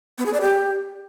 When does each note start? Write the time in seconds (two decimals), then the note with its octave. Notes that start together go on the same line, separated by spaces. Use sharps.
0.18 B3
0.26 G#4
0.33 D5
0.41 G4